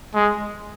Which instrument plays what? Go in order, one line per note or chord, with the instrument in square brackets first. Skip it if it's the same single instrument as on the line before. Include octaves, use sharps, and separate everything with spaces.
[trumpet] G#3